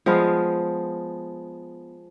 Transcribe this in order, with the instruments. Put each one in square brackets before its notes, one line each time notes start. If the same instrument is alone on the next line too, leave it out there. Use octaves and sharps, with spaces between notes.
[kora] F3 G#3 B3 F5